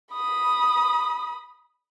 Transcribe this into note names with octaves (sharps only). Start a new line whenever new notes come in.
B5 D#6